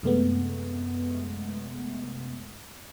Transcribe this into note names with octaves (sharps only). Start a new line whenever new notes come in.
F#2 C3 G#3 A3 B3